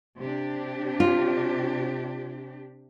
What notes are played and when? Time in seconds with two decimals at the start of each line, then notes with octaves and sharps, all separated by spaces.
0.19 C3 D4 G4
1.00 F4